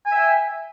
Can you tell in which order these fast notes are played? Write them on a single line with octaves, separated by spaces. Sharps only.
G#5 E5 G5